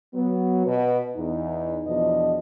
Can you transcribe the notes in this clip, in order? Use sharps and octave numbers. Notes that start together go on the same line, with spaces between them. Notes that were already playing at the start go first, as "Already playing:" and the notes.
F#3 B3
B2 B4
E2 D#4
E2 B2 F3 D4 D#5